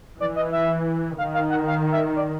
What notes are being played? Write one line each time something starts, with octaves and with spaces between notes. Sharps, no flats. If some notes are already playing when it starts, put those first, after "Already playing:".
E3 D5
D#5
E5
D#3 F5
F5
F#5
F5
E5
D5